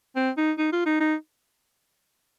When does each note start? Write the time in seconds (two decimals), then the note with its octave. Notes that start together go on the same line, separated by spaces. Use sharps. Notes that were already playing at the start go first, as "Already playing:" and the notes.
0.16 C4
0.37 D#4
0.58 D#4
0.72 F4
0.86 D#4
1.00 D#4